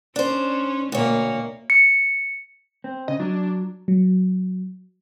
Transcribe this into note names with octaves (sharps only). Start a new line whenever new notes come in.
C#4 D4 C5
D2 B2 A#3 C#5
C#7
C4
C#3 D#5
F#3 D4
F#3